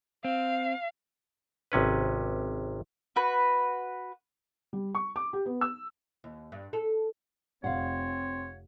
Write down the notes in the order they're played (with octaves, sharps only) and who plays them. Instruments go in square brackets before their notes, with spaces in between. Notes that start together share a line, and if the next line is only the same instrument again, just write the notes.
[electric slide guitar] C4 [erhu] F5
[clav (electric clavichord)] G#1 C3 C#4 B4
[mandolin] F#4 B4
[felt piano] G3
C#6
D6
G4
B3
E6
[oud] D#2
G2
A4
[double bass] F1 [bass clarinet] C4 [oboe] C#5 [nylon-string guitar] F5 F#5